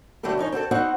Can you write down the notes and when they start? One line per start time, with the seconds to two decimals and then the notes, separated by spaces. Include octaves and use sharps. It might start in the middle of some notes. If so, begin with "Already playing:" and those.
0.23 D3 F#3 A3 E4 G4 A4
0.38 F3 C#4 D#4 C#5
0.52 C4 F#4 G4 A4
0.71 B3 C4 D#4 F#4 F#5 G#5